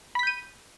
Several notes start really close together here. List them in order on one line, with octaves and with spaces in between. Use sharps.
B5 B6 G6 D#7